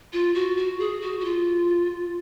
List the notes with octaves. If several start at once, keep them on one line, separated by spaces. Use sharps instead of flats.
F4
F#4
F#4
G#4
F#4
F#4
F4